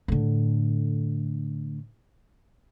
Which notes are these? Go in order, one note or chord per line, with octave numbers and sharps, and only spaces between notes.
A2 D3